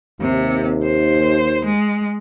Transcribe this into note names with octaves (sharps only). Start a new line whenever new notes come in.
D#2 C3
C5
G#3